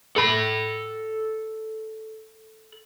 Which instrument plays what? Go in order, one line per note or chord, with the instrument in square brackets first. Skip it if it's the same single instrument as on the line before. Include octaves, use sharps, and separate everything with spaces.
[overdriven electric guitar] A4 B5